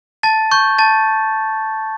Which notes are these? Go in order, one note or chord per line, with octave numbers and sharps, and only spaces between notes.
A5 A6
C#6 G6
A5 A6